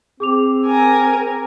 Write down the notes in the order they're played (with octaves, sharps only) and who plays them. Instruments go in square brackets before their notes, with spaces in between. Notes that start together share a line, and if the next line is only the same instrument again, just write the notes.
[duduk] C4 [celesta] G#4 D6 F7
[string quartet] A#4 G#5 A#5